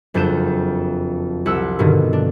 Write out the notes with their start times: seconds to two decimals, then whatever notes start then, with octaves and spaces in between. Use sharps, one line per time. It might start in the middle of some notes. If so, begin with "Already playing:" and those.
0.14 F#1 F2 D4 G6 E7
1.46 C2 F#5 E6
1.79 G2 B2 D3 D#3
2.13 D4